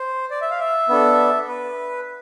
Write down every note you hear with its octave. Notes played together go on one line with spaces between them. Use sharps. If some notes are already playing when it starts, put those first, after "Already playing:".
Already playing: C5
D5
E5
F5
E5
B3 D4 A4
B4